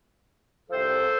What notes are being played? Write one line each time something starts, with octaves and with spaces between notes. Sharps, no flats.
C2 C3 F3 A4 C5